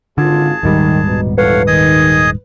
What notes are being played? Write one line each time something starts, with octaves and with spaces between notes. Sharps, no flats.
G#1 D3 F4 G#4 A5
D#1 G#2 D#3 G3
B2 B3 D#4
G1 E3 A4 B4 C#5 F5 F#5
D#3 G#4 D#5 D#6